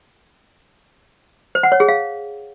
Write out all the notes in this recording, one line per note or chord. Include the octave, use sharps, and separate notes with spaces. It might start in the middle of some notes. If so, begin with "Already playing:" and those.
C5
F#5
C#5
G#4
F5